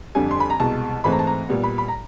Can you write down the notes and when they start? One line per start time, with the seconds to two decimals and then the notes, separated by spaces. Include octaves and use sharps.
0.15 F2 D3 G3 G#5
0.31 C6
0.40 B5
0.50 A#5
0.59 C2 B2 G#3 A5
1.04 G#2 E3 A3 C4 B5
1.12 A#5
1.19 A5
1.27 A#5
1.49 A#2 G3 B3
1.64 B5
1.78 B5
1.88 A#5